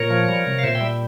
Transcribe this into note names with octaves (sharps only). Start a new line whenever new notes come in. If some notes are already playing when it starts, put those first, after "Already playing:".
Already playing: A#2 A#4 C#5
F3
G3
C3
F5
A#2 C5 E5
E5 G5
G3